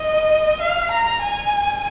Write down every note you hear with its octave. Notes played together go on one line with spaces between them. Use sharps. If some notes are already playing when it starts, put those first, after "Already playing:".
Already playing: D#5
F5
A#5
G#5